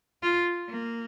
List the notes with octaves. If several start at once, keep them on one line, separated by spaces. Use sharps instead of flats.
F4
A#3